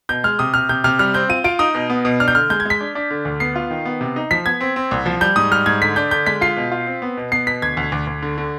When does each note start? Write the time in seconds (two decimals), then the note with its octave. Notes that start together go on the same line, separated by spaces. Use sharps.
0.09 B2 G6
0.24 G#3 F6
0.39 C3 D#6
0.54 C3 F6
0.69 C3 G6
0.84 C3 F6
0.99 G3 F6
1.14 C4 G6
1.29 F4 D#7
1.44 F4 D7
1.59 D#4 D#6
1.75 B2
1.90 B3
2.05 B2
2.20 D4 F6
2.28 G6
2.35 D3 F6
2.50 G#3 G6
2.60 G#6
2.65 G#3 B6
2.80 D4
2.95 D4
3.11 D3
3.25 D2
3.40 B3 C7
3.56 F4
3.71 D#3
3.85 B3
4.01 C3
4.16 D#4
4.31 F3 B6
4.46 B3 G#6
4.61 C4
4.76 C4
4.91 C2
5.06 F3
5.21 G3 G6
5.36 G#2 D#6
5.51 G3 F6
5.66 G#2 G#6
5.81 D3 B6
5.96 D4 G6
6.11 D3 G6
6.26 G#3 B6
6.41 F4 C7
6.57 B2
6.72 F4
6.87 C4
7.02 B3
7.17 B2
7.32 B3 C7
7.47 B2 B6
7.62 D2 G#6
7.77 D2
7.92 D2
8.07 D2
8.22 D3
8.38 D3